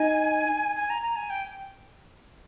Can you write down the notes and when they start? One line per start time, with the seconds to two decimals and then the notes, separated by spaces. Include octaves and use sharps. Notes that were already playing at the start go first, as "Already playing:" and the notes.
Already playing: D#4 G#5
0.76 G#5
0.90 A#5
1.03 A#5
1.16 G#5
1.30 G5